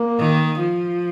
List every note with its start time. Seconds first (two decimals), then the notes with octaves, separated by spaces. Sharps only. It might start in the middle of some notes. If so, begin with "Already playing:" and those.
Already playing: A#3
0.19 D#3
0.61 F3